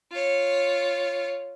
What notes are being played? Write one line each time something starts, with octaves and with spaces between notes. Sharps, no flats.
F4 C#5